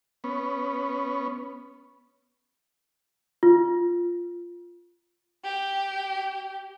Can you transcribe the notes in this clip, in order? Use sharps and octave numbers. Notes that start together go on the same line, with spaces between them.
B3 C#4
F4
G4 G5